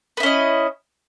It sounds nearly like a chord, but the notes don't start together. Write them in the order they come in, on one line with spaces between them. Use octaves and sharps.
B3 E4 C#4 D#5